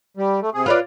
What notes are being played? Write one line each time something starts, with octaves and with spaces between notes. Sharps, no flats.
G3
A3
C3 G#4
F4 B4 C#5 D5